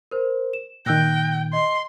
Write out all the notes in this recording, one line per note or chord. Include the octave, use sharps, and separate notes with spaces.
A#4 C5
E7
A#2 D#3 G5 E6 F#6 A#6
D#5 C6